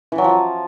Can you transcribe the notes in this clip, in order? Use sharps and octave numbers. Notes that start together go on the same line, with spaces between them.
E3
F#3
F3